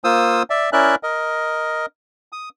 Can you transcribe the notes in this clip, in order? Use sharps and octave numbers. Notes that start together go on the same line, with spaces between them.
A#3 F4 C5 D#6 E6
D5 E5
C#4 E4 A#4 D5 E5 F#6
A#4 D#5
D#6